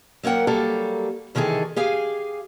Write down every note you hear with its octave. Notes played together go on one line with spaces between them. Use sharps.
F#3 A#3 A#4 F#5 G5
F#3 G3 A#3 G4 A4
C3 D#3 E3 G#4 A4
G4 G#4 F5 G#5